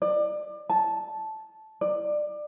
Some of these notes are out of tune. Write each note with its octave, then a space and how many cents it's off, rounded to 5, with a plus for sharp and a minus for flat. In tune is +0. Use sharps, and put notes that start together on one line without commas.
D5 +30
A5 -10
D5 +25